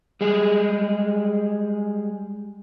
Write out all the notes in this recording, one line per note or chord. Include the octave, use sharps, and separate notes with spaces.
G3 G#3 G#4